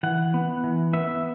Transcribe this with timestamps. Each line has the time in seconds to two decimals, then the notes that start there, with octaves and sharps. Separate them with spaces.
0.03 E3 F#5
0.34 B3
0.64 E3
0.93 B3 E5